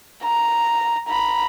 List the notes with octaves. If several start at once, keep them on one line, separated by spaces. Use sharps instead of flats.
A#5
A#5 B5